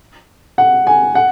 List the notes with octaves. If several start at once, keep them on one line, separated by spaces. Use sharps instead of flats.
F#5
G#5
F#5